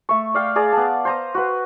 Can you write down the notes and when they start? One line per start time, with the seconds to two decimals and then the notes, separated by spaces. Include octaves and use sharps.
0.09 A3 C#6
0.34 D5 F5 G5
0.56 G#4 D5 A#5
0.73 B3 A5
1.05 C5 A#5 D#6
1.35 F#4 B4